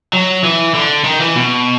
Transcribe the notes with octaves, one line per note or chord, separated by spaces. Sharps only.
F#3
E3
D3
D#3
E3
B2